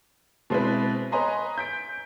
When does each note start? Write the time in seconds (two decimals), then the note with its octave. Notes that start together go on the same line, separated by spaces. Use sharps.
0.50 B2 G#3 C4 E4 B4
1.12 B4 C#5 D#5 G#5 A#5 C6
1.58 G6 B6 D7